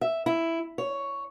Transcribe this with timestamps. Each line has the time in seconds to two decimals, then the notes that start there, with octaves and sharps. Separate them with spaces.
0.01 E5
0.26 E4
0.78 C#5